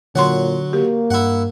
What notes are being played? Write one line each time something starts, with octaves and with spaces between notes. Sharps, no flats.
A#2 D3 F#3 C#5 F#5 C6
A#3 G4
G2 E4 F#5